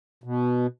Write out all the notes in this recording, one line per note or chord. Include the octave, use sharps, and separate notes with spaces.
B2